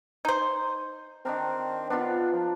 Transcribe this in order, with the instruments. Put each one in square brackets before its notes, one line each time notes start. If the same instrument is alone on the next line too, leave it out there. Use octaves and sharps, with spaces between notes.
[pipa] D#4 C5
[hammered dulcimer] D#3 D4 A#4 [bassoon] C4
[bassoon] B3 [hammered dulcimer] D4 F4
[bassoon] F3